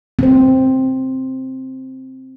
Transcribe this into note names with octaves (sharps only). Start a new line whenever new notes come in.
C4 C5